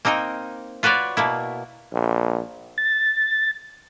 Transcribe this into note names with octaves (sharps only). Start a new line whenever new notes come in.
A#3 C4 D#4 A#4 D#5
F4 F#4 B4 C#5 D5
B2 A#3 E4
A#1
A6